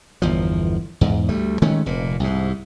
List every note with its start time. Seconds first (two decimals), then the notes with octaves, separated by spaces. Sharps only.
0.22 G1 E2 F3
1.01 E2 G#2
1.29 D2 G3 A3
1.62 D#3 G#3 A3 C#4
1.86 F1 A#2
2.20 C2 G#2